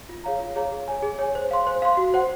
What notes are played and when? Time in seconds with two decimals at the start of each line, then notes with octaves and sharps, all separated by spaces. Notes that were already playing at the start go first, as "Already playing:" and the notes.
0.09 F4
0.24 G#4 C#5 F5 A#5
0.40 F4
0.56 G#4 C#5 F5 A#5
0.71 G#4
0.88 C#5 G#5
1.03 G#4
1.19 C#5 G#5
1.35 C5
1.51 F5 C6
1.67 C5
1.82 F5 C6
1.97 F#4
2.14 C5 F#5